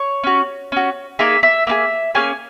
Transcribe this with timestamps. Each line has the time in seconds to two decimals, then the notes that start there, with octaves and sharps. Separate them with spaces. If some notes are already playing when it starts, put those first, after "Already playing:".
Already playing: C#5
0.23 C#4 F#4
0.72 C#4 F#4
1.19 A#3 D#4 G#4 E5
1.43 E5
1.67 A#3 D#4 G#4 E5
2.15 A#3 C#4 G#4 G#5